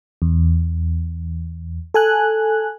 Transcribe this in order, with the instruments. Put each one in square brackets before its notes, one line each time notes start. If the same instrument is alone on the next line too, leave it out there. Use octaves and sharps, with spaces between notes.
[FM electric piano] E2
A4 G#5 F#6